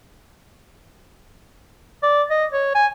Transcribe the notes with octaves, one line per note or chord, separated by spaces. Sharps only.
D5
D#5
C#5
G#5